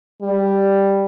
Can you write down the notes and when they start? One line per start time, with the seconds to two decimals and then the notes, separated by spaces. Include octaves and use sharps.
0.22 G3